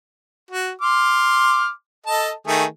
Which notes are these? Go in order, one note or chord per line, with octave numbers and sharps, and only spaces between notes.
F#4
C6 D6 F6
A4 D#5 A5
D#3 A3 G#4